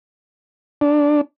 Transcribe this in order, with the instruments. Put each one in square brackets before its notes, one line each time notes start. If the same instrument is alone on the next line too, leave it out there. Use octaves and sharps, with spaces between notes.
[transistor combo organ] D4